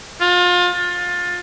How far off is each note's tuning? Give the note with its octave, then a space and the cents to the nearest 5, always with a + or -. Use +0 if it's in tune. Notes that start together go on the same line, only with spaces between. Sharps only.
F4 +30
F4 +25